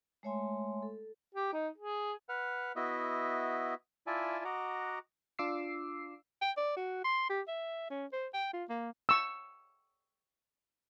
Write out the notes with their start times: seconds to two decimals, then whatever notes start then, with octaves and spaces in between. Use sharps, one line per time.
0.23 G#3 A3 C#5 E5 G#5 C6
0.82 A4
1.35 G4
1.53 D#4
1.78 G#4
2.29 B4 F#5 F6
2.76 B3 E4 F#4 D#5 E5
4.07 E4 F4 D5 E5 G#5 A5
4.45 F#4 D#5 F#5 A#5 D6
5.39 D4 F4 D6 E6 C7
6.42 G5
6.57 D5
6.77 F#4
7.04 C6
7.30 G4
7.48 E5
7.90 C#4
8.13 C5
8.34 G5
8.53 F4
8.69 A#3
9.09 C#6 E6